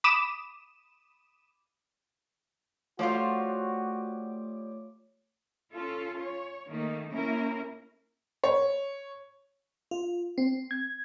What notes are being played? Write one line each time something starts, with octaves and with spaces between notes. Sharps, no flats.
B5 D6 D#6 D#7 E7
F3 G3 A3 F4 F#4 C#5 D6
C#4 F4 A4
C#5
D#3 A3 A#3 D#4
A#3 C#4 E4 A#4
C#5
F4
C4
G#6